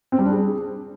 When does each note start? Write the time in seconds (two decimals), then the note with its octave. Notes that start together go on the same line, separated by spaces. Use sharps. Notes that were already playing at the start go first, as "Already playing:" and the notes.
0.12 C4
0.19 G3
0.25 D4
0.31 G#4